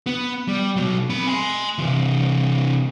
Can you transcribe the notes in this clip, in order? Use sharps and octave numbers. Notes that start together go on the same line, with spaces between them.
B3
G3
B2 F#3
C4 B5
G#5 C6
C3 E3